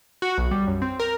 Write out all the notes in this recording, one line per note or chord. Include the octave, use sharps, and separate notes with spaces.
F#4
B1
G3
F#2
C4
A#4